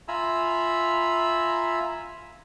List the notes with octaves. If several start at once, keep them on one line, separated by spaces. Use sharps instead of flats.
F4 E5 G#5 A#5 B5 E6